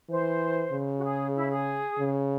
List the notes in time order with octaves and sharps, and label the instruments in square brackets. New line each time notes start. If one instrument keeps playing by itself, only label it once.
[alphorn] E3 [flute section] C5
[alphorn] C#3
[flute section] F#4
G#4
E4
G#4
[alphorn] C#3